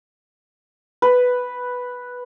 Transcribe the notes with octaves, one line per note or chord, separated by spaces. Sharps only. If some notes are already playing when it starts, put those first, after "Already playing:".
B4